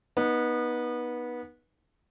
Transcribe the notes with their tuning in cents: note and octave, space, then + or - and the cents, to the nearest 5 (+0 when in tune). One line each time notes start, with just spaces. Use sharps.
B3 -20 D#4 +0